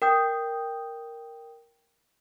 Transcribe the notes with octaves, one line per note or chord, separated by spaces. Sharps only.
A#4 G5 D#6 G6